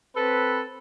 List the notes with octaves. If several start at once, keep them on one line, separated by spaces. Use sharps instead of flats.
C4 A4 B4